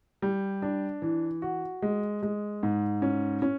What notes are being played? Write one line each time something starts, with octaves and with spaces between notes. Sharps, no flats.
G3
D4
E3
F#4
G#3
G#3
G#2
C#4
C#4